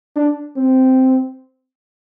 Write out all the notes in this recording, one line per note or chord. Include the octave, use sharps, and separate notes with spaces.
D4
C4